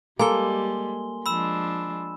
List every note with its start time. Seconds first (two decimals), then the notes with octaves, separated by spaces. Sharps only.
0.19 G3 G#3 A#3 A4 G#5 C6 G7
1.26 F3 G#3 D4 B5 E6 E7